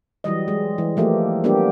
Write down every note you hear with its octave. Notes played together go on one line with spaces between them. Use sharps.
E3 F#3 G3 D#5
G#3
E3
F3 A3 A#3 G4
G3 A#3 B3 D4 G4